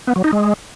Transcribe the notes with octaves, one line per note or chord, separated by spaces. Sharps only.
B3
F#3
D#4
G#3